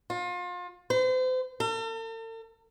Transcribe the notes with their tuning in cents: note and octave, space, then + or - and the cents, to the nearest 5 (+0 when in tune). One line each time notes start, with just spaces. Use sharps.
F4 +30
C5 -40
A4 +45